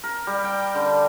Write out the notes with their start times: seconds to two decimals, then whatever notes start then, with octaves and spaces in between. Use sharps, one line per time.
0.04 A#4
0.27 G3
0.44 G5
0.75 D3